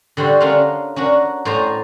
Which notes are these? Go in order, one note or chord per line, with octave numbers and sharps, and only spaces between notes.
D3 G3 F#4 C5
C#4 D4 F4 A#4 F5
C#4 D4 F#4 A#4
A2 C5 D5 G#5 A#5